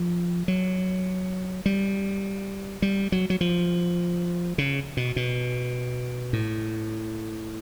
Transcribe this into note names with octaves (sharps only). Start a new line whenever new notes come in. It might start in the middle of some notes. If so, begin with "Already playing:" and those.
Already playing: F3
F#3
G3
G3
F#3
F#3
F3
C#3
B2
B2
A2